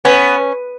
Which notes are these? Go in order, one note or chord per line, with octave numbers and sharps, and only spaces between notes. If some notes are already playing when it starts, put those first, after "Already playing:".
B3 C#4